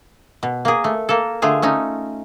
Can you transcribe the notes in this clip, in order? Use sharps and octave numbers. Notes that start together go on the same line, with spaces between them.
B2
A#3 G#4
A3
A#3 A4
D3 A3 F4 G#4
A3 C#4 D#4